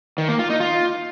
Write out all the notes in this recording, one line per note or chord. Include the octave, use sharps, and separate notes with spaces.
D#3
A#3
F4
D#4
F4